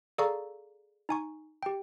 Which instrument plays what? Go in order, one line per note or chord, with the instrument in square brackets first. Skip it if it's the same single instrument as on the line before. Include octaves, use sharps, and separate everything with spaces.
[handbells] G#4 A4 D5 F5 A#5 C#6
D#4 G#5 C#6
G4 G5